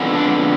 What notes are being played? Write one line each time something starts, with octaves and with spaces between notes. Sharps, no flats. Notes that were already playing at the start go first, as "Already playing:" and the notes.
Already playing: F2 D3 G#3 B3
D4